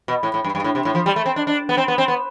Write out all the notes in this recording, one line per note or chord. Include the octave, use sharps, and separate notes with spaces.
B2
A2
A2
G2
G2
A2
C3
A2
F3
G3
A3
C4
D4
D4
B3
C4
B3
C4
B3